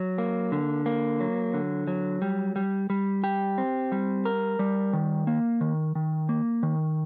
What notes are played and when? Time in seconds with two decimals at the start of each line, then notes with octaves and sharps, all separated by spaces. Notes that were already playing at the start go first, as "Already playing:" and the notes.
Already playing: F#3
0.18 A#3
0.52 D3
0.86 A#3
1.20 F#3
1.54 D3
1.87 F#3
2.22 G3
2.56 G3
2.90 G3
3.24 G4
3.58 C4
3.92 G3
4.25 A#4
4.59 G3
4.93 D#3
5.27 A#3
5.61 D#3
5.95 D#3
6.29 A#3
6.63 D#3